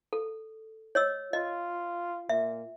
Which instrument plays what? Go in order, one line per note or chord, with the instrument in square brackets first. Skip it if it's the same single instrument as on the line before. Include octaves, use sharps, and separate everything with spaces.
[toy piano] A4
C#5 D#5 E6
[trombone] F4 [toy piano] D#5
[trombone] A#2 [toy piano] E5